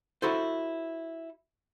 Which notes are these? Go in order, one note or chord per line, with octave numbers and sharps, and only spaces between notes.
E4 F#4 A4 C5